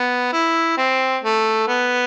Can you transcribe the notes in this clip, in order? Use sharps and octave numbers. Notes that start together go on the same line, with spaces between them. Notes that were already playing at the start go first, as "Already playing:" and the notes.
Already playing: B3
E4
C4
A3
B3